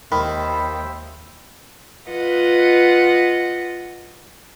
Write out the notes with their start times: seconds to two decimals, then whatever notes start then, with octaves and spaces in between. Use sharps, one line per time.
0.12 D#2 D#3 C5 E5 G5 B5
2.10 F4 B4 D#5 F#5